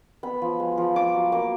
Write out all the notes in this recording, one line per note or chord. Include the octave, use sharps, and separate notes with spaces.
B3 B5
F3
G#3
F3
F4 D6
F#3
A#3 D6